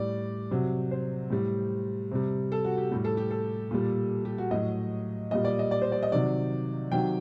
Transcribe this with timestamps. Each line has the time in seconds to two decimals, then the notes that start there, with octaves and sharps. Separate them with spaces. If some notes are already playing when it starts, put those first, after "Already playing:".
Already playing: A2 G3 D5
0.51 C3 F#3
0.91 C5
1.30 A2 G3
2.12 C3 G3
2.52 A4
2.65 F#4
2.78 G4
2.92 A2 G3
3.05 A4
3.17 G4
3.31 A4
3.71 A#2 G3
4.25 G4
4.38 F#4
4.51 A2 F#3 D#5
5.31 A#2 G3 D#5
5.45 D5
5.59 D#5
5.71 D5
5.82 C5
5.92 D5
6.03 D#5
6.12 C3 D#3 F#3 D5
6.92 C3 D#3 F#3 G5